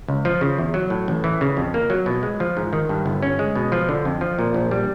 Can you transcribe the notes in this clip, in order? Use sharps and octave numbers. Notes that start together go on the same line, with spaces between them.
C#2
F3
C#3
E2
F#3
A2
A1
E3
C#3
F2
A#3
F#3
B2
G#3
F3
G#2
D#3
G2
G1
C#4
G#3
B2
F3
D3
F2
F3
A#2
A#1
G3